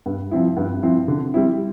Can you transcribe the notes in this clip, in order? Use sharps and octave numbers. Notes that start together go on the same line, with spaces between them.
G2
F3 C4 E4
G2
F3 C4 E4
D3
G3 C4 E4